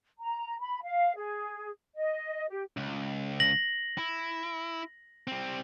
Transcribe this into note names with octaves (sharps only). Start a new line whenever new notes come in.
A#5
B5
F5
G#4
D#5
G4
C#2
A#6 F#7
E4
G3 C4